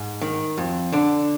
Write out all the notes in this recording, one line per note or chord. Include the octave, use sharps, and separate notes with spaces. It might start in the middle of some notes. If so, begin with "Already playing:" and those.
Already playing: G#2
D#3
F2
D3 D4